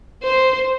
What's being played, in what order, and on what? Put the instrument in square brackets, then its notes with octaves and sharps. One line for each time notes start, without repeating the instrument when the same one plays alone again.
[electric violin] C5